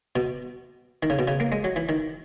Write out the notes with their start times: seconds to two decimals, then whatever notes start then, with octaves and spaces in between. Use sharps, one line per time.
0.16 B2
1.03 D#3
1.10 C#3
1.19 B2
1.28 C#3
1.40 A#3
1.52 G#3
1.64 F#3
1.76 E3
1.89 D#3